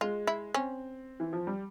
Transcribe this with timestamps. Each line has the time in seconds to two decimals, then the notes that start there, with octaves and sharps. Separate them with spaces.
0.01 G#3 F4
0.27 E4
0.54 C4 C#4
1.20 E3
1.33 F3
1.47 G3